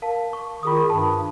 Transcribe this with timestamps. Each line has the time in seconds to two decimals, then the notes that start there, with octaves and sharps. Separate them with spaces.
0.02 A#4 F5 A5
0.33 C#6
0.63 D#3 F4 G#4 D#6
0.90 G2 A5